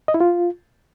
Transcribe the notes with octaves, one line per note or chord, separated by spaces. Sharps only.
D#5
E4
F4